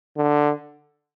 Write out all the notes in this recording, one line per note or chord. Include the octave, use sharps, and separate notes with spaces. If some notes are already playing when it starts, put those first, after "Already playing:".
D3